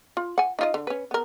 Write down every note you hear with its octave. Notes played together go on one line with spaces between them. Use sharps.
F4
F#5 G#5
D#4 F4 D#5
D3
C#4 B4
B3 A#4